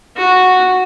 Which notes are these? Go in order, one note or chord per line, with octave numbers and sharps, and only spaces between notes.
F#4